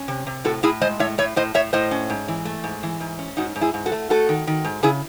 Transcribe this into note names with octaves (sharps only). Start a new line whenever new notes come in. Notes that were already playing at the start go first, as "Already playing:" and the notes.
Already playing: C#4
C3
C3
A2 F#4 A4
A2 E4 G#4
G#3 C5 D#5
A2 C#5 E5
A2 C#5 E5
A2 C5 D#5
A2 C#5 E5
A2 C5 D#5
C#4
G#2
E3
A3
G#2
E3
G#2
C#4
G#2 D#4 F#4
G#2
E4 G#4
G#2
F#4 A4
A3
A3 F#4 A4
D#3
D#3
G#2
C#3 E4 G#4